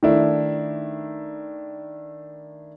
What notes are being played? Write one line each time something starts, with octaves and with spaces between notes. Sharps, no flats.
D#3 A3 D4 E4